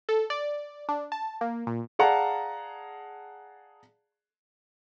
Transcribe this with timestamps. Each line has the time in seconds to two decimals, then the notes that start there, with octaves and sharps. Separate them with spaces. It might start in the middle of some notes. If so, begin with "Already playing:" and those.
0.09 A4
0.30 D5
0.89 D4
1.12 A5
1.41 A#3
1.67 A#2
1.99 G#4 D5 F5 F#5 A5 A#5